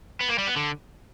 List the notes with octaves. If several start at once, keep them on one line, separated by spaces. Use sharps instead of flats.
B3
A#3
G3
B3
D3